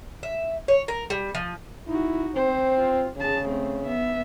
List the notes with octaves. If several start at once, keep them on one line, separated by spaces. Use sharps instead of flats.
E5
C#5
A#4
G3
F3
D#4 E4 F#4
C4 C5
F4
C#3 G#4 A5
A3 C4
B3 E5